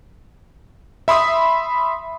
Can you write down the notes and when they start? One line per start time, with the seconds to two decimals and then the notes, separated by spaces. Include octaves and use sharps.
1.08 E5 B5 C6 D#6